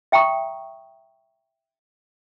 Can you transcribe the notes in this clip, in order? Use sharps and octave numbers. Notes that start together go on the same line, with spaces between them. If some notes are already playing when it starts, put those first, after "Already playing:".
E5 G5 A5 A#5 C#6 D#6